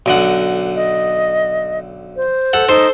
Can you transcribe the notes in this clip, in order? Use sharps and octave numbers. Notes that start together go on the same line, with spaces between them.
B1 D3 F#5
D#5
C5
A4 F#5
D#4 A4 C5